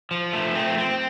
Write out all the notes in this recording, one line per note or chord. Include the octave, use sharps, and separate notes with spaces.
F3
A3
C4
C4